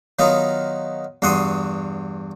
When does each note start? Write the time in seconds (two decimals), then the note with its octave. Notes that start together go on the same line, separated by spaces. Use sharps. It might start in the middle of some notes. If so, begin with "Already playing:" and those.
0.19 D#3 F#3 B3 D#4 F4
1.22 E2 G2 F#4 C6 C#6 D#6